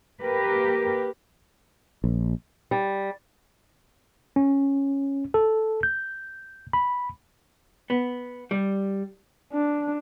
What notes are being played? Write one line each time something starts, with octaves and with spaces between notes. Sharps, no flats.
A#3 G4 A#4 B4
A#1
G3
C#4
A4
G6
B5
B3
G3
D4